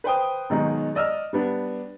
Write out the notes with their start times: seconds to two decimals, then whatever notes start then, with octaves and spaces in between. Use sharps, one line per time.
0.04 B4 C5 G5 D#6
0.50 B2 D#3 F#3 G#3 D#4
0.95 D5 D#5 E6 F6
1.33 G3 B3 D4